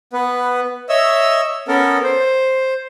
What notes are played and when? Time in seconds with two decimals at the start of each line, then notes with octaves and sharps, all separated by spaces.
0.13 B3 B4
0.89 C#5 D#5 E5 E6
1.68 B3 C#4 A4 A#4
2.03 C5